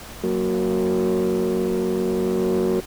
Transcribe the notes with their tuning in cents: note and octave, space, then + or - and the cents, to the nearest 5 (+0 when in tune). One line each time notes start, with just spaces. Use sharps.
F#3 +0 A#3 -10